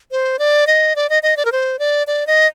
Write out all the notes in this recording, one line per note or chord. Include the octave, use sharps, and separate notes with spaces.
C5
D5
D#5
D5
D#5
D#5
D5
A#4
C5
D5
D5
D#5